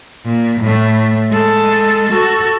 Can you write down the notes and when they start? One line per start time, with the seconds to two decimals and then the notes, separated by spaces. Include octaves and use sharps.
0.25 A#2
0.60 A2 A3
1.31 G#3 A4
2.09 F#4 A4